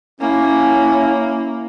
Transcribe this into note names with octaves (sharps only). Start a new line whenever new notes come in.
A#3 C#4 E4